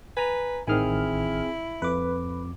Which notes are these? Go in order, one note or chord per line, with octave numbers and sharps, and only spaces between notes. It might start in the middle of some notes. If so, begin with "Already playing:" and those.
B4 G#5 A#5
A1 D#3 C4 E4 G#4 G#5 F6
F2 B4 D6